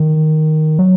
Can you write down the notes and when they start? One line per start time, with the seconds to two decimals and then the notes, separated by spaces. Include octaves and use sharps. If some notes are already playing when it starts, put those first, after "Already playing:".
Already playing: D#3
0.79 F#3